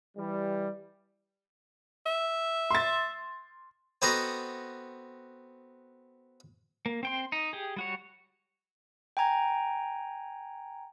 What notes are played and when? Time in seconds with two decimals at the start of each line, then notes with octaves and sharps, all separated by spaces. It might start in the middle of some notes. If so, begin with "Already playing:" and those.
0.17 E3 G3
2.06 E5
2.71 C6 A6
4.02 B3 C4 F#4 A4 D#5 A#5
6.86 A#3
7.03 C4 G5 C6
7.32 D#4
7.53 G4 G#4
7.76 G3 F#4 C#5
9.17 G5 G#5 A#5 G#6